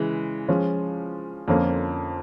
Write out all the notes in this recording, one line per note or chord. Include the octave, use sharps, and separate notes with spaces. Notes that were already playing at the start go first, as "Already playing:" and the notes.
Already playing: C#3 E3 G#3
F3 G#3 C#4
F2 D3 F3 A#3 C#4